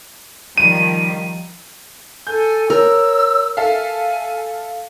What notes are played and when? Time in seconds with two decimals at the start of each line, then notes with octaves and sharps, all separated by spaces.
0.58 D#3 F3 G3 D#7
2.27 A4 G#5 G6
2.70 A#4 C#5 E6
3.57 A4 E5 F5 G#5